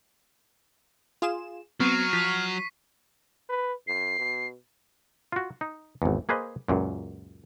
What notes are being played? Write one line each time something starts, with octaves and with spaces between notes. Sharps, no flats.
F4 G#4 E7
F#3 B3 C4 C#6 F6 C7 D#7
F3 B6
B4
F#2 C7
B2
F4 F#4
D#4
G#1 E2
A#3 G#4 B4 C5 D#5
C#2 F#2 A#2